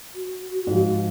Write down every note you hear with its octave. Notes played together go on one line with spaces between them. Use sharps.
F#4
G#2 F3